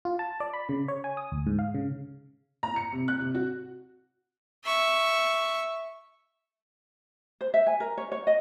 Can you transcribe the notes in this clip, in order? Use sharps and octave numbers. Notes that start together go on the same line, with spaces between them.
F4
A5
D5
B5
C#3
C#5
G#5
D#6
D2
G#2
F5
C#3
A#5
C#7
C3
F#6
C3
F#4
E5 C#6
C5
E5
G#5
A#4
C#5
C#5
D#5